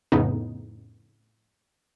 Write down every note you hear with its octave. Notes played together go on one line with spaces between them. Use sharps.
F2 A2 C#3 B3 D#4